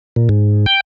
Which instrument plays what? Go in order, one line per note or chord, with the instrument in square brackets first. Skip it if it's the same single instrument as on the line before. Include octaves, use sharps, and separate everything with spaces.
[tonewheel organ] A#2
G#2
G5